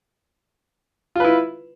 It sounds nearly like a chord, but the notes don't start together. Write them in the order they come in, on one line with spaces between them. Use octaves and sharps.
F4 B4 E4